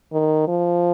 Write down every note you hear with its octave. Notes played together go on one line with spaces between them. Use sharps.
D#3
F3